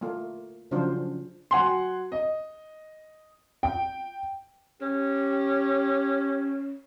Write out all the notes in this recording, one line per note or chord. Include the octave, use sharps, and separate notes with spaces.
A3 A#3 F4
C#3 F3 F#3 D4 F4 C5
F#3 F#5 G#5 C6
D#5
G5
C#4 G4